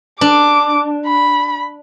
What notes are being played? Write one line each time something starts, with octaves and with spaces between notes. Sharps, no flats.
D4 D6
B5